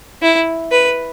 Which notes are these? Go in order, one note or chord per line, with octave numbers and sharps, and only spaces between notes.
E4
B4